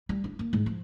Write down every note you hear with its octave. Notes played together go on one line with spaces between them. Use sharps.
G3
D4
A#3
G#2
F3